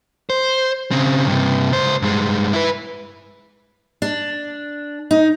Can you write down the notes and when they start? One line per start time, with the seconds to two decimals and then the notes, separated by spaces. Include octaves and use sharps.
0.30 C5
0.91 C#3 C4
1.27 G2 C3
1.72 C#2 C5
2.02 G2 G#3
2.53 E4 B4
4.02 D4
5.11 D#4